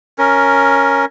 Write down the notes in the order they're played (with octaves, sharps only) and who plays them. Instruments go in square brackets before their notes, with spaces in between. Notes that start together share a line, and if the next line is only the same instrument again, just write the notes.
[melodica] C#4 A#4